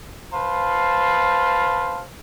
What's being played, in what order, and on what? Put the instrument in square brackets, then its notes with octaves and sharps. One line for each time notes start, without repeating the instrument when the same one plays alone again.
[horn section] B4 C5 F5 A5